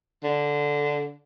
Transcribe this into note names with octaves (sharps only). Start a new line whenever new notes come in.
D3